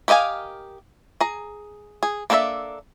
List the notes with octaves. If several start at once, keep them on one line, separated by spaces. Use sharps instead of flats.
G4 A#4 D#5 F5 G#5
G#4 A#5
G#4
A#3 D4 A4 C5 E5